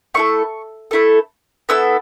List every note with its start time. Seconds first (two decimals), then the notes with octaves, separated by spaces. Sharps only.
0.14 A3 E4 A4 C#6
0.91 A3 E4 A4
1.69 B3 E4 A4 E6